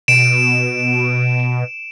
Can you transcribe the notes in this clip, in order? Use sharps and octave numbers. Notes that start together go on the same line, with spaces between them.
B2 D7 E7